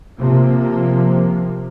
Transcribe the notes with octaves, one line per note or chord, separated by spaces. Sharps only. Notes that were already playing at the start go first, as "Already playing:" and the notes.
C3 F3 A#3